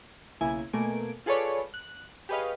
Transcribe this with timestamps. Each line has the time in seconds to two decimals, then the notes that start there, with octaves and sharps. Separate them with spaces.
0.41 B1 C#3 A#3 E4 G#5
0.73 B2 A3 A#3 G#5 D7
1.26 F4 G#4 A4 B4 C#5 D5
1.74 F#6
2.29 G4 G#4 B4 C#5 D#5 F5